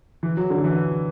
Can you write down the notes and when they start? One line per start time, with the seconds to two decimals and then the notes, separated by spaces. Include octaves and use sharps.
0.23 E3
0.37 F#3
0.50 D3
0.64 E3